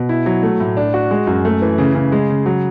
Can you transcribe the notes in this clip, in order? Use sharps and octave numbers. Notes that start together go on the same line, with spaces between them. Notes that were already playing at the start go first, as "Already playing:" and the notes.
Already playing: B2
E4
F#3
A3
A2
D4
F#4
G#3
F#2
A3
E3
C#3
C#3
G#3
C#3
F#3